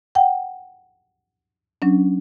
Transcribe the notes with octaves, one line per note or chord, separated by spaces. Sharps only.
F#5 G5
F#3 C#4 D4